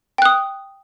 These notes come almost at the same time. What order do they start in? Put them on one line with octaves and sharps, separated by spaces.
G5 F#6 D#6